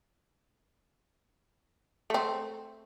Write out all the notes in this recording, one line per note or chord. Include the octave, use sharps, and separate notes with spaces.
A3 C4